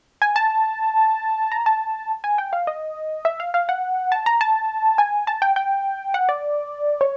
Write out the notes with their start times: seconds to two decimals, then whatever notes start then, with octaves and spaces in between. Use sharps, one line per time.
0.22 G#5
0.36 A5
1.52 A#5
1.66 A5
2.24 G#5
2.38 G5
2.53 F5
2.67 D#5
3.25 E5
3.40 F5
3.54 F5
3.69 F#5
4.12 A5
4.26 A#5
4.41 A5
4.98 G#5
5.27 A5
5.42 G5
5.56 G5
6.14 F#5
6.29 D5
7.01 C#5